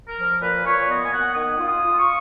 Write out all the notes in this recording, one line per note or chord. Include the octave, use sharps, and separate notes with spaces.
A#4
F3
A#2 B4
A#2 C#5
B3 D#5
G#5
B3 F#5
D#3 D#6
F4
D#6
F4
C#6